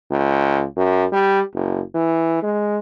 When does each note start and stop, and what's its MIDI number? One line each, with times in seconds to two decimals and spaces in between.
0.11 0.65 37
0.77 1.05 42
1.12 1.40 55
1.54 1.81 30
1.95 2.39 52
2.43 2.79 56